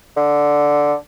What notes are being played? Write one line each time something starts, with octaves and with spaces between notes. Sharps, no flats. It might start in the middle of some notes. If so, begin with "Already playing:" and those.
D3